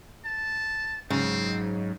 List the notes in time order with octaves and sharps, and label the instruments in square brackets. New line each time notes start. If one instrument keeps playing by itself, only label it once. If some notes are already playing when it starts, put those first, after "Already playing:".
[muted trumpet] A5
[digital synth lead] G#2 [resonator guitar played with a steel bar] C#3 [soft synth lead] F#3 [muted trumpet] C4